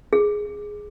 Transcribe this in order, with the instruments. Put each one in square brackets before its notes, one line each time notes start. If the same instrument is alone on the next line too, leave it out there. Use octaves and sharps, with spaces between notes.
[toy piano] G#4